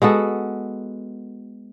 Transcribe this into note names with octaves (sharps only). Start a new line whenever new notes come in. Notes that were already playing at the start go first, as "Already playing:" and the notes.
G#3 B3 F#4 A4